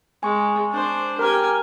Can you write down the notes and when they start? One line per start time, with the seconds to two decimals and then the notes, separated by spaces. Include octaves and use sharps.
0.23 G#3 G#5 C#6
0.71 D4 C5
1.19 G4 A#4 G#5 A#5 F6